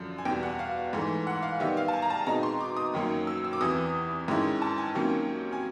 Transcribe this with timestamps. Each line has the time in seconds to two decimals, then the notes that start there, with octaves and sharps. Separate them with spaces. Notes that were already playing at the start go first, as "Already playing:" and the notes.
Already playing: F#2 D3 F3
0.18 G#5
0.25 E2 B2 G3 G5
0.43 F#5
0.59 F5
0.93 G#2 E3 A3
1.27 F#5
1.43 F5
1.60 D#3 G3 B3 E5
1.77 F5
1.88 A5
1.93 G#5
2.02 A#5
2.10 A5
2.27 B2 G#3 C4 D#4 A#5
2.43 C6
2.61 D6
2.77 D#6
2.94 F#2 D#3 F#3 A#3 C#4
3.27 E6
3.44 E6
3.53 D6
3.61 E2 C3 E3 D#6
4.28 G#2 D#3 G#3 C#4 E4
4.62 A5
4.78 G#5
4.95 C3 D#3 F#3 A#3 C#4
5.53 G#5